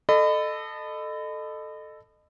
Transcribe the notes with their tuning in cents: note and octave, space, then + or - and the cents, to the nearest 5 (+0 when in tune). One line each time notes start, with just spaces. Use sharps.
A4 +0 D#5 -30 B5 +30